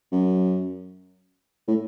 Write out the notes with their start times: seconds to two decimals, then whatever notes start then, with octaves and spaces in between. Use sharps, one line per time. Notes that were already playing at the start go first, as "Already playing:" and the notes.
0.12 F#2
1.68 A2